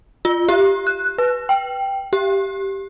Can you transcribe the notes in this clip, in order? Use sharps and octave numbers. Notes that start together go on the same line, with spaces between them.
F4
G4
F#6
B4
G5
G4